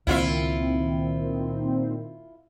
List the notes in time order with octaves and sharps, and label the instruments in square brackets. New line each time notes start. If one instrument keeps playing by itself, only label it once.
[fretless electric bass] C#2 C#4 [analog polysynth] A#2 D#3 C4 [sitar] E4 F4 E5